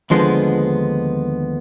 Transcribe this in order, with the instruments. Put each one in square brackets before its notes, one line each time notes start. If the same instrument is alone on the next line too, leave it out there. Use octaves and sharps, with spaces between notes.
[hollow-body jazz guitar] D#2 D3 F3 G#3 B3